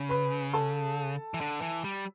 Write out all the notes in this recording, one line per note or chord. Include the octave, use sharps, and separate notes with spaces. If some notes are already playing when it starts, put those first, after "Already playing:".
Already playing: C#3
B4 B5
A4 A5
E3
D3
E3
G3